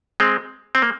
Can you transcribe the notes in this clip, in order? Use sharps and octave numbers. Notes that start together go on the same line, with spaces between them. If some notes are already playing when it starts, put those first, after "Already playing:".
G#3 C4
C4
A#3